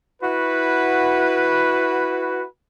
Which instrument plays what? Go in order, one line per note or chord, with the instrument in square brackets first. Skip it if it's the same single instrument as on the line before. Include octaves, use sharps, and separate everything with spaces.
[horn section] E4 F#4 B4